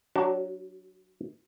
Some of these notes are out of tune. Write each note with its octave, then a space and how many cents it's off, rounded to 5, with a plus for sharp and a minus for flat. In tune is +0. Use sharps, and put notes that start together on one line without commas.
F#3 +0 D4 +0 F#4 +40